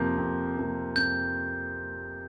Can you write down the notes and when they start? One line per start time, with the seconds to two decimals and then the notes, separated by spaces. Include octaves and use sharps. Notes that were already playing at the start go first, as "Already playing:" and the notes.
Already playing: F2 C3 F3 A#3 G6
0.18 F2
0.57 C3 F3 A#3
0.96 F2 G6